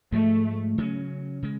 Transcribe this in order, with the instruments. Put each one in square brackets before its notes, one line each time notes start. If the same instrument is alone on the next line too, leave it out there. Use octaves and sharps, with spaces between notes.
[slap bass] G#2 F3 G#3 [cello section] A3
[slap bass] C#3 F#3 C#4
C#3 G#3